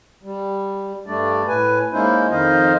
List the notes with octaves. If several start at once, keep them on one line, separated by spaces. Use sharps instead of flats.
G3
G2 G3 A3 D4 D5
A2 B4 G#5
G#3 A#3 C#4 D#4 E4 C5
F2 D#3 D#4 C5 D#5 F5